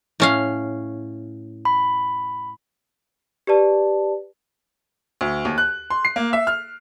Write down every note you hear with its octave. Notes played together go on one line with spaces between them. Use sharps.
A2 C#4 F5
B5
G4 B4 D5 A5
D2
D#2
F#6
C6
C7
A#3
E5
F6